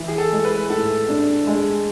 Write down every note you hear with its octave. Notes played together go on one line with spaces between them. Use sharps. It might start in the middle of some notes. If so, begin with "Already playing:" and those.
Already playing: E3
G#4
A4
G#3
B4
A2 A4
D4
G#3